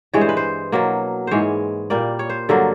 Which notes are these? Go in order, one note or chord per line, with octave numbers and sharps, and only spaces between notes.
G2 E3 G#3 C#5
C5
B4
C5
B2 F#3 A#3
G#2 E3 G#3 C5 C#5
A#2 G3 A#3 D5
C#5
C5
G2 D3 F#3 A#3 A4